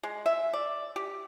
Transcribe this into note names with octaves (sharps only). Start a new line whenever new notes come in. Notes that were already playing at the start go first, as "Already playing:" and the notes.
G#3
E5
D5
G4